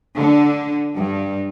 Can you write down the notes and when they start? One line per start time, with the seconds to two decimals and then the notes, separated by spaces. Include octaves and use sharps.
0.17 D3
0.97 G2